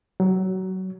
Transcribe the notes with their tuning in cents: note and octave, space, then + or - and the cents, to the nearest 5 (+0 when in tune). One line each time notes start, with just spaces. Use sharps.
F#3 +20